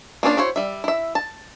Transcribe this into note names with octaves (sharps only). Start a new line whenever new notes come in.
A#3 B3 C#4 D4 F4
E4 F#4 C5 C#5
G3 E5
E4 E5
A5